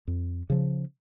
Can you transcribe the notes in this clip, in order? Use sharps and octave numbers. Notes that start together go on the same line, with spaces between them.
F2
C#3 F3